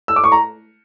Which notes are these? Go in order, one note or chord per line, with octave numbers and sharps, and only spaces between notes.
E6
D6
C#6
A#5